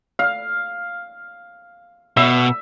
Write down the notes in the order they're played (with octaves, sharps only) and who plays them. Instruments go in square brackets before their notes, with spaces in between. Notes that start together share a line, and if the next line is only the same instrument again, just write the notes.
[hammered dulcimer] F5
[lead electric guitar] B2 [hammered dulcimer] E5